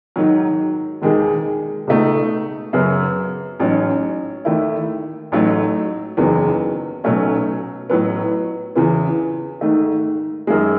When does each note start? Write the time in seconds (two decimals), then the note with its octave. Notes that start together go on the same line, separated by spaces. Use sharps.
0.16 G#2 D#3 F#3
1.02 E1 D#2 D#3 G#3
1.87 C#2 B2 A3 D#4
2.73 F#2 C#3 F#3 B3
3.60 A1 G#2 F#3 C#4
4.45 D#2 D#3 A3 E4
5.32 A1 G#2 F#3 A3
6.17 F#1 E2 D#3 F#3 B3
7.04 B1 B2 F#3 A3 C#4
7.90 A1 A2 F#3 B3
8.76 E2 C#3 E3 B3
9.61 G#2 D#3 A3
10.47 F#2 D#3 G#3